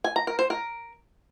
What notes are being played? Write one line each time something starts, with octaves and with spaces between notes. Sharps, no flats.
G#5
A#5
A#4
C5
A#4